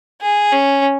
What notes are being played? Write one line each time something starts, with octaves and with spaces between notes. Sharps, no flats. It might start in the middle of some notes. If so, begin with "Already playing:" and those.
G#4
C#4